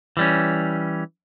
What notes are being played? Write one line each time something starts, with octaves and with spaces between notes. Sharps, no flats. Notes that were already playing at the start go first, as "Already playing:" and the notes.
E3 G3 C#4